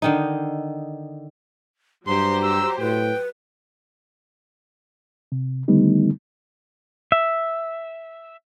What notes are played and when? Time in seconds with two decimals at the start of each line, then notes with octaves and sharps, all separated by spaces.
0.02 D3 D#3 D#4
2.07 G2 F#3 G4 C5 A#5 C6
2.43 E6
2.79 A2 B4 G5
5.32 C3
5.68 D3 D#3 G3 A3 B3 D#4
7.12 E5